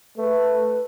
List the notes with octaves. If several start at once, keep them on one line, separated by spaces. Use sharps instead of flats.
A3 B4